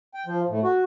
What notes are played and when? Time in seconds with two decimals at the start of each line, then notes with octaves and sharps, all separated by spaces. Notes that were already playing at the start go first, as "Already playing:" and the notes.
0.14 G5
0.26 F3
0.49 A2
0.63 F#4